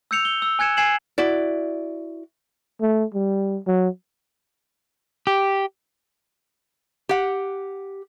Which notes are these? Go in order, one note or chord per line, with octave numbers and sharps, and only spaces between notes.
E6 G6 C#7 F7
G7
E6
G#5 F#6 G#6 C#7 E7
G#5 G#6 C7 E7 F#7
E4 F#4 D5
A3
G3
F#3
G4
G4 F#5